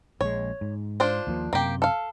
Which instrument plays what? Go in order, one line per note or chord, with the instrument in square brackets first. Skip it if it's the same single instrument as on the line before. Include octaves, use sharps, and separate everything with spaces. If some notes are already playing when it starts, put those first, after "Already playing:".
[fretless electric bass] A#1 D3 G#3 [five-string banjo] C#5
[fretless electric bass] G#2
[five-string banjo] D4 F4 C5
[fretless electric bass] D#2 F3 A#3
[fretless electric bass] F#2 C3 [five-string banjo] A#3 G4
[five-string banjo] A4 F5